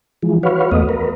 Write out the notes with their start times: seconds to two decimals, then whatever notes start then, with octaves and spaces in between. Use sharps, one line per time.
0.22 E3 F3 G#3
0.43 F#4 B4 C#5 F5
0.72 E2 A3 B3 D#5
0.89 A#4 B4